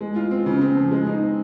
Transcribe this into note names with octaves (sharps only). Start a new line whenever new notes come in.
G#3
F4
C4
C#3
C4
F3
G#3
D#4
C4